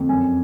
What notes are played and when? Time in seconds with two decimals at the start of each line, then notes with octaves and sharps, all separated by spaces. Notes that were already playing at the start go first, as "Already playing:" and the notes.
Already playing: F2
0.09 F#2 G#5